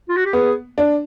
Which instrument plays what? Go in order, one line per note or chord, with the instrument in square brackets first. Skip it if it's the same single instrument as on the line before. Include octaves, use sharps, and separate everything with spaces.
[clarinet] F4
F#4
G4
[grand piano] B3 [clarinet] G#4
[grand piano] D4